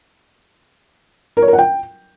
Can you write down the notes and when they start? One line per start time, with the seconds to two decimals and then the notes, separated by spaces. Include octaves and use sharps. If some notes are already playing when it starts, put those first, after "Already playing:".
1.37 A#4
1.42 C#5
1.48 A#4
1.53 F#5
1.59 G5